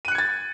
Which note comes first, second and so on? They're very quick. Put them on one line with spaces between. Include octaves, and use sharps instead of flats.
D#7 F#6 C#7 G#6 A6